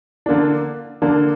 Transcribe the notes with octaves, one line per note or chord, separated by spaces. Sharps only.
D3 A#3 D4
D3 A#3 D4